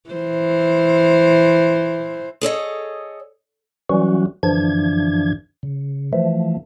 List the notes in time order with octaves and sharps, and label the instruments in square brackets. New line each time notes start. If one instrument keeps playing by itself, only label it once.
[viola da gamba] E3 C5
[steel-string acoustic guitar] G#4 A4 C#5 D#5
[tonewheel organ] E3 F#3 G3 C#4 F#4
F#2 D3 E3 F3 D4 G#6
C#3
E3 F3 A3